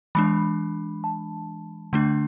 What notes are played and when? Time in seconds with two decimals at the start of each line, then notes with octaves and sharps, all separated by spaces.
0.15 E3 G#3 D4 B5
1.04 A5
1.93 D3 A3 D4